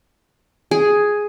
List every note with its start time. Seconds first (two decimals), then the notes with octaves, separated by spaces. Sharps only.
0.71 G#4